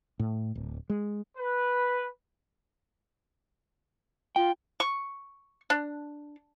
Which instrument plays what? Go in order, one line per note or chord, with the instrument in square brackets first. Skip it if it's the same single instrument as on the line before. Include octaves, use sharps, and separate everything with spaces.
[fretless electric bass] A2
D1
G#3
[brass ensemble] B4
[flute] F4 [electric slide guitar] G5
[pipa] C#6
D4